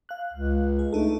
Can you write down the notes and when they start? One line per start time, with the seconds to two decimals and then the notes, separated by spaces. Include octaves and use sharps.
0.09 F5 F#6
0.33 C#2
0.79 G#4
0.93 A3 D4 D#4 A4